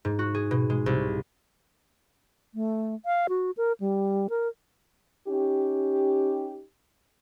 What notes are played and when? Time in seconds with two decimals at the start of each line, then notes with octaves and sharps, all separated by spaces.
0.05 G#2
0.19 F#4
0.35 G#4
0.51 B2
0.70 G#3
0.86 C2
2.54 A3
3.06 F5
3.29 F#4
3.57 A#4
3.80 G3
4.30 A#4
5.28 C#4 D#4 G4